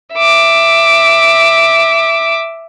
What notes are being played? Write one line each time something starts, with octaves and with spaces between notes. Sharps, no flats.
E5 D6